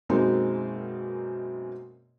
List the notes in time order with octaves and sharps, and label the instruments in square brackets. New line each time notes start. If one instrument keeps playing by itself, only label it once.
[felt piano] F#2 B2 G#3 A#3 C4 D#4